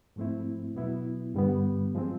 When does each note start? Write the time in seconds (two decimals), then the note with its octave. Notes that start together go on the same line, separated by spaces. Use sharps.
0.16 G#2 F3 A3 C4 E4
0.75 B2 F#3 B3 E4
1.34 G2 D3 G3 B3
1.93 A2 F3 G#3 C4